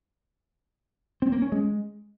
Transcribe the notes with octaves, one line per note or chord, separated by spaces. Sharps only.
C4
A#3
C#4
G#3